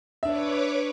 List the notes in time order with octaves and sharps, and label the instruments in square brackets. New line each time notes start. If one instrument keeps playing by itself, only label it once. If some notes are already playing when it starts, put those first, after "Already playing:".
[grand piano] D4 E5 [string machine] B4 C#5 D6